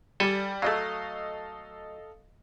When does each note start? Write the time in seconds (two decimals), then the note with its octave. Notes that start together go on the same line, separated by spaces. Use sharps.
0.20 G3 A4 D5 G#5
0.62 F#3 A3 A4 D#5 F5